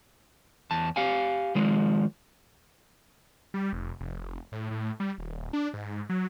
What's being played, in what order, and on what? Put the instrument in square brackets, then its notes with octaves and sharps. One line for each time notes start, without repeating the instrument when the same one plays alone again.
[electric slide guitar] E2 A5
G4 F5 G#5
D#3 F3 G#3
[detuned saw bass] G3
F1
F1
A2
A2
G3
D#1
D4
G#2
F#3